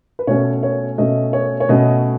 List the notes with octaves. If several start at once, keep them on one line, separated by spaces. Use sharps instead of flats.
B4
B2 A3 C#4 C#5
C#5
B2 A3 C#4 D#5
C#5
C#5
B2 A3 C#4 D#5